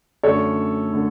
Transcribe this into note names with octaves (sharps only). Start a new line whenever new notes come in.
F#2 D3 A3 C#4 A4 C#5
D3 A3